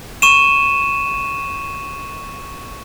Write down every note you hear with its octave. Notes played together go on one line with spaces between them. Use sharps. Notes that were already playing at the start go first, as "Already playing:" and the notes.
C#6 D#7 E7